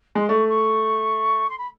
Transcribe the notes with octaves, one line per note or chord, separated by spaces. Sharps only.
G#3
C6
A3 C#6
C#6
C6
B5